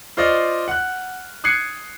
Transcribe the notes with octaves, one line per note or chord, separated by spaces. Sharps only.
F4 C5 D5 D#5 C#6 F6
F#5 F#6
D#6 F#6 G#6 C7 C#7